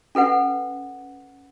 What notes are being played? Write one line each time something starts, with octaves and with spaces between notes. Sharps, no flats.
C#4 A4 B4 F#5